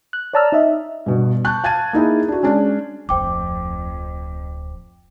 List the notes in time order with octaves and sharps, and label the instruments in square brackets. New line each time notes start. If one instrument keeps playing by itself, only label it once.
[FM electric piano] F#6
C#5 D5 A5 A#5 E6 F6
D#4 D#5 E5
[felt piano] G2 B2
A5 C#6 F#6 G6
F5 A5 G#6 A6 D#7
A#3 D#4 E4 G#4
D4 F#4
G#3 C#4 D4
[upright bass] D1 F3 [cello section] F2 [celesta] C5 G5 D6